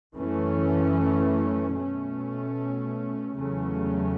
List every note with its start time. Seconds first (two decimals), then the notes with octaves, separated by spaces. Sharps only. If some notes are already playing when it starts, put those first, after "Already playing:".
0.14 F#2 E3 A3 C#4
1.76 B2 A3 C#4
3.35 E2 C#3 F#3 A3 C#4